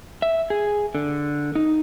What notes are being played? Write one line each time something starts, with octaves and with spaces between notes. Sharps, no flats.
E5
G#4
D3
D#4